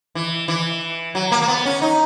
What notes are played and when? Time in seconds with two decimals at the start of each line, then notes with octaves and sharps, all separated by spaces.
0.15 E3
0.48 E3
1.15 F#3
1.32 A#3
1.42 A#3
1.48 B3
1.65 C#4
1.82 D#4